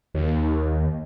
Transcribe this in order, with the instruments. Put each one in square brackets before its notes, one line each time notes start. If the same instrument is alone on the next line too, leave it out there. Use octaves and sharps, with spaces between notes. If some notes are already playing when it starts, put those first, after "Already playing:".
[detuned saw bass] D#2